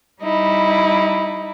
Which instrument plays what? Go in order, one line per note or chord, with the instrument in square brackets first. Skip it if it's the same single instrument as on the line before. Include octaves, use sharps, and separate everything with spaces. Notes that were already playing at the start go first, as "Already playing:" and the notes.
[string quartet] G3 D#4 E4